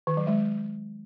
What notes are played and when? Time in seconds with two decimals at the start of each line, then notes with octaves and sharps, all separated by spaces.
0.07 D#3
0.17 F#3
0.27 G#3